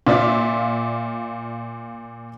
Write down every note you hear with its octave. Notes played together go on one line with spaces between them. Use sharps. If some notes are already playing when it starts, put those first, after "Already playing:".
A#2 F4 D5 E5 D6